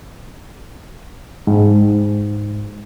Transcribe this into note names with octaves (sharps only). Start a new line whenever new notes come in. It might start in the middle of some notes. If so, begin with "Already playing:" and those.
G#2